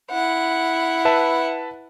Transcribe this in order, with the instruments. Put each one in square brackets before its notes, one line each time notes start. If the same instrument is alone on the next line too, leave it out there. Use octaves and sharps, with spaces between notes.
[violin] E4 F#5
[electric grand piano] B4 E5 A5